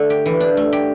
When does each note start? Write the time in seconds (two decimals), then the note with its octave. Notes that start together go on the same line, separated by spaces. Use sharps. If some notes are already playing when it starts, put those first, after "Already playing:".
Already playing: D3 A3 D4
0.10 G4
0.26 E3
0.40 D4
0.57 A3
0.73 G4